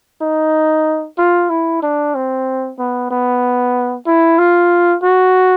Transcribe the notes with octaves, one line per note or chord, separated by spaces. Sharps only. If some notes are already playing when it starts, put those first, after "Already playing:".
D#4
F4
E4
D4
C4
B3
B3
E4
F4
F#4